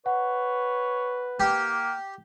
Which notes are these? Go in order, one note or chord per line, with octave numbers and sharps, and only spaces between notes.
B4 C#5 F#5
A#3 G4